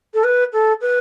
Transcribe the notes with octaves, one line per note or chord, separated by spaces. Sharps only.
A4
B4
A4
B4